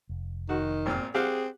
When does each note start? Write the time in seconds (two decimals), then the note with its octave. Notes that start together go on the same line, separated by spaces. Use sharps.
0.09 F1
0.49 D#3 F#4
0.86 G#1 A#2 C4 F6
1.14 C4 G4 G#4 F5 F#5